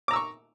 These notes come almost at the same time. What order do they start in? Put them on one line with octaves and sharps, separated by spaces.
D6 A#5 E6 C#6